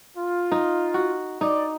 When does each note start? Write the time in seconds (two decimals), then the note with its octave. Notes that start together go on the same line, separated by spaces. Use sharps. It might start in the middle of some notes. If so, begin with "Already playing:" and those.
0.17 F4
0.52 D#4
0.94 F#4
1.41 D#4 D5